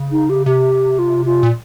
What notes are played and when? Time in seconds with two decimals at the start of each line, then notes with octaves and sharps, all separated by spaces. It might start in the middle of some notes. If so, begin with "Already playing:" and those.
Already playing: C#3
0.12 D#4
0.30 G4
0.46 C3 G4
0.99 F4
1.26 F4
1.43 A#2